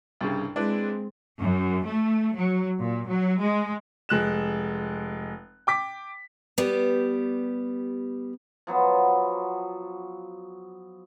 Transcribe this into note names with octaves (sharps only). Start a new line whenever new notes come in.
C2 G2 C#3
G#3 C4 D4 E4 B4
F#2
A3
F#3
A#2
F#3
G#3
F1 G#3 F#6 E7
G5 D6 B6
G3 B3 G4 D5
F3 F#3 B3